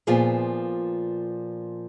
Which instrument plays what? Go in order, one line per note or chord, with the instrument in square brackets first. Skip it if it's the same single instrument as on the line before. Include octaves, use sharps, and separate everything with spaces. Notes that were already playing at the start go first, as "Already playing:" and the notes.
[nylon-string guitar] A#2 F3 B3 F4 G#4